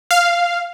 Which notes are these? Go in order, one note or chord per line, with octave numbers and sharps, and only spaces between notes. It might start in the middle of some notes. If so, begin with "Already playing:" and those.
F5